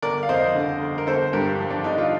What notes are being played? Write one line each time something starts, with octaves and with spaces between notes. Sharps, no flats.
G1 A#4 D5
F5
F2 C5 D#5
D3
G1
A#4
G1 A4 C5
G2 G4 A#4
F3
D4
G1 D#4
F4